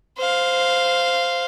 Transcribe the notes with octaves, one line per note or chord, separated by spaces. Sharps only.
C5 F5